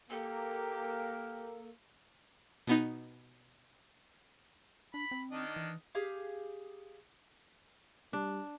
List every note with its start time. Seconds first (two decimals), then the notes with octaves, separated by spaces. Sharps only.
0.10 A#3 G4 A4
2.67 B2 B3 D#4
4.94 D4 B5
5.11 C4
5.31 D#3 D4 D#5
5.56 E3
5.95 G4 G#4 F5
8.13 G3 D4